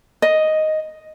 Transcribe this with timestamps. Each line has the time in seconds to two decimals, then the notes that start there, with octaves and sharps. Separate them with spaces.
0.22 D#5